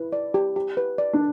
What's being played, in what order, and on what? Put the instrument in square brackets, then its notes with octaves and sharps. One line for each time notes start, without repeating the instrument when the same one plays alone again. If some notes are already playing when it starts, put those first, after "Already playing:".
Already playing: [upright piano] E4 [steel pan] B4
[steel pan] D5
G4
G4
B4
D5
[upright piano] D4